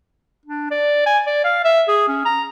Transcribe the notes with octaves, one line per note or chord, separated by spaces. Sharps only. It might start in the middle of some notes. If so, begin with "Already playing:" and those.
D4
D5
G#5
D5
F5
E5
G#4
C#4
A#5